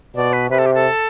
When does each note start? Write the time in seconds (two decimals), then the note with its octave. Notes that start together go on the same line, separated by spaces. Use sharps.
0.15 B2 D5
0.33 B4
0.50 C3 B4
0.59 A4
0.66 G4
0.74 A4